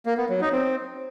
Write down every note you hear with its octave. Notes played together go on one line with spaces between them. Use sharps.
A#3
B3
F#3
D#4
C4